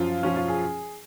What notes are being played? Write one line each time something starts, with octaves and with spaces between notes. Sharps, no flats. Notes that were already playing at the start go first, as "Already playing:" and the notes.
Already playing: F#2 F3 F4
F#2 F3 C#4
F4
G#4